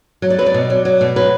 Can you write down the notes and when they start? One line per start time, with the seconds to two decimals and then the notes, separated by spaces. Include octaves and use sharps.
0.22 F#3
0.30 D5
0.38 F#3 B4
0.46 D5
0.54 B2
0.70 F#3
0.85 F#3
1.01 B2
1.16 F#3 B4